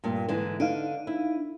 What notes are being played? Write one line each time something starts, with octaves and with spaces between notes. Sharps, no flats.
G2 A#2
G#2 D3 E3
D3 D4 D#4 F5
E4